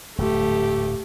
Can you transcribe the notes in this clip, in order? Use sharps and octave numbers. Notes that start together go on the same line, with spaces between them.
D1 F2 G#2 A3 G4